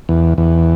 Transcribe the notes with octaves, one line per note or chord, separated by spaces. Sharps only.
E2
E2